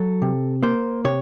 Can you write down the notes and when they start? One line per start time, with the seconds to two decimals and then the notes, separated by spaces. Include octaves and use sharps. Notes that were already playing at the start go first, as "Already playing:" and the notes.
Already playing: F#3 A4
0.22 C3
0.63 A#3 C5
1.05 C3 C#5